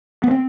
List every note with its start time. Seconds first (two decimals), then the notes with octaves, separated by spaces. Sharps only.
0.24 B3
0.31 C4